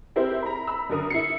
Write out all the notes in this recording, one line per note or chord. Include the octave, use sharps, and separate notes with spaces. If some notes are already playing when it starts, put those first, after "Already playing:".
C4 E4 G4 A#4 C5
A#5 B5
B5 E6
F#2 D3 A#4 D#6
E4 C7 C#7